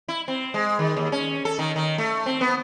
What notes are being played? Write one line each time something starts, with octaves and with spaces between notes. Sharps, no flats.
E4
C4
G#3
D#3
D#2
C#4
A4
D#3
D#3
A3
C4
B3